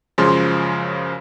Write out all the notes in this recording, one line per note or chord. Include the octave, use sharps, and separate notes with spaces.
F#2 C#3 F3 G#3 C6